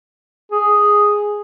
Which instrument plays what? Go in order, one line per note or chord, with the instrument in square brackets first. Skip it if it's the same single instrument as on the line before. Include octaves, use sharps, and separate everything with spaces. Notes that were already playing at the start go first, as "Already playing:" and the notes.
[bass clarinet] G#4